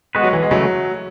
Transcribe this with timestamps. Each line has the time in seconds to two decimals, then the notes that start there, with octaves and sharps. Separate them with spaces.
0.15 G#3 B3 F#4 B4
0.24 F#3
0.33 E3
0.42 G#3
0.51 C#3 E3 F#3 A3